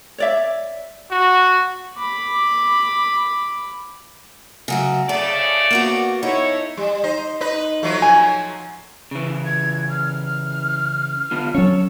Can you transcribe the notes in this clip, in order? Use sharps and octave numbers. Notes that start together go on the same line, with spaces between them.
C#5 D5 E5
F#4
B5 D6
C#3 F#3 A3
C#3 A3 A4 D5
A#3 B3 F#4
D#4 E4 A4 C#5
G3
D#4 C5 D#5
D#4 B4 D#5
F3 F#3 A3
G#5
C#3 E3
G#6
F6
D3 B3 F4
F#3 C#4 A4 C#5